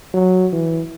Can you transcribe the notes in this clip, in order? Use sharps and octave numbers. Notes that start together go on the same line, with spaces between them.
F#3
E3